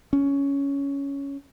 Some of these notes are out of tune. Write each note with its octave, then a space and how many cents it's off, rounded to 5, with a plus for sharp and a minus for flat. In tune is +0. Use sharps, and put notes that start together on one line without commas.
C#4 +10